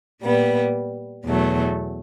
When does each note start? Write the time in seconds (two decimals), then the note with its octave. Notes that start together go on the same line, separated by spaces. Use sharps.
0.23 A#2 G3 B3
1.25 E2 B2 F#3 A3